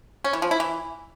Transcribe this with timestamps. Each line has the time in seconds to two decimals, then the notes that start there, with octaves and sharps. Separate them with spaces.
0.24 C#4
0.33 E3
0.42 F3
0.51 E4
0.60 E3